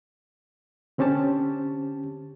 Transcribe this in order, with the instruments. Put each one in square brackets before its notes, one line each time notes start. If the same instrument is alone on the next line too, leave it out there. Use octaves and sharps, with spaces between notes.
[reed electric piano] D3 C4 C#4 G4 A5